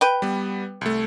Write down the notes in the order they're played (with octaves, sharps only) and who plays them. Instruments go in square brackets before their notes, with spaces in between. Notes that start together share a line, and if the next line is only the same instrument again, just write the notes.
[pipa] B4 G5
[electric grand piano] G3 B3
C2 A3